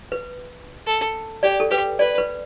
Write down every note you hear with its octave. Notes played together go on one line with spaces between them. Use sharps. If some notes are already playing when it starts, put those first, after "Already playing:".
B4
A4
G4 D5
A4
G4 B4
B4 D5
B4